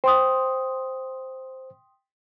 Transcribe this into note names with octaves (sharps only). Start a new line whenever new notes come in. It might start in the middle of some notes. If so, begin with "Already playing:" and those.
C5 G5 C6 D#6